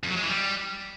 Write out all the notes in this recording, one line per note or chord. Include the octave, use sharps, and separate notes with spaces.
F2
F#3
G#3
E3
G3